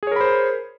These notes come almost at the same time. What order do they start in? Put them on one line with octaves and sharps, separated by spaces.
G#4 C#5 A#4 B5 C5